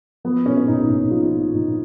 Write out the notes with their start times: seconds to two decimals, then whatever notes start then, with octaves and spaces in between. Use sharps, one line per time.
0.24 F3 B3
0.46 A#2 C#4
0.57 C#4
0.68 A#1 D#4
0.89 A#1 D#4
1.11 F3 F4
1.33 A#2
1.54 A#1 D#4